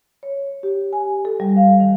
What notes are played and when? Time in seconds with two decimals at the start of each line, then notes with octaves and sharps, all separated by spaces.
0.23 C#5
0.63 G4
0.93 G#5
1.25 A4
1.40 G3
1.56 F5
1.80 D#3